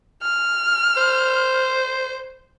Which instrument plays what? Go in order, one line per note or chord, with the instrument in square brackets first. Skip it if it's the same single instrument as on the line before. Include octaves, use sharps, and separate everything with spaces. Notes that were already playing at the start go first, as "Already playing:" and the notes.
[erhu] F6
[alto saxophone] C5